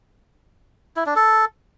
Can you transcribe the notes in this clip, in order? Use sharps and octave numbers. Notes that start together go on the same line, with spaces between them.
E4
D4
A4